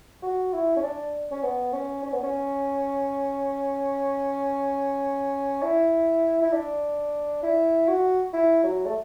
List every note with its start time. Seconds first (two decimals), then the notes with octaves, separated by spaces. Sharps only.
0.23 F#4
0.53 E4
0.76 C#4
0.83 D4
1.31 C#4
1.43 B3
1.73 C#4
2.03 C#4
2.13 B3
2.23 C#4
5.63 E4
6.42 E4
6.53 D4
7.43 E4
7.88 F#4
8.33 E4
8.63 F#3
8.86 A3